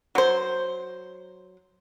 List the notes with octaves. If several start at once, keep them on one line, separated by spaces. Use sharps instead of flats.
F#3 C5